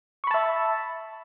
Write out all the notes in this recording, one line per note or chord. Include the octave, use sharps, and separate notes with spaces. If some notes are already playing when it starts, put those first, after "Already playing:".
E5 A5 B5 C#6